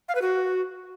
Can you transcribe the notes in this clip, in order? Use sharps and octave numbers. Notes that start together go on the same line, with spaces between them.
F5
B4
F#4